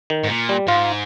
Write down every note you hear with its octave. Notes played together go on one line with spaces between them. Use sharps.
D#3
G#2
A#2
G3
G#2 F4